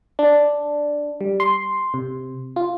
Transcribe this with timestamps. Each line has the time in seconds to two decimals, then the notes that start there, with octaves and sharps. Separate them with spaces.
0.19 D4
1.21 G3
1.40 C6
1.94 C3
2.56 F4